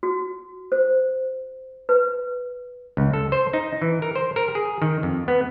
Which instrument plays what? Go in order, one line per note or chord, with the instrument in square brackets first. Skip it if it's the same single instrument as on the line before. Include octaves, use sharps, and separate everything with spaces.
[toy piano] F#4
C5
B4
[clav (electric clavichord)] C#2
A4
C5
D#4
E3
A#4
C5
A#4
G#4
D#3
F2
B3